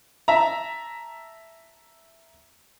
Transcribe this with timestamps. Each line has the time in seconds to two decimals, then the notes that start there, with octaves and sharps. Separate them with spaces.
0.28 E5 A5 A#5